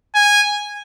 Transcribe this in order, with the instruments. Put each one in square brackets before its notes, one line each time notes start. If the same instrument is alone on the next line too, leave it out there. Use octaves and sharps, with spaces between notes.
[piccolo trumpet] G#5